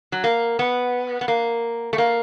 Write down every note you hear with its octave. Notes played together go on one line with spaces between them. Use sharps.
F#3
A#3
B3
B3
A#3
A3
A#3